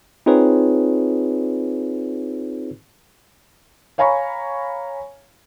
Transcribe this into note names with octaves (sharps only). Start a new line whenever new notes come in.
C4 D#4 F4 G#4 B4 C#5
C#5 F5 G#5 A#5 B5 C#6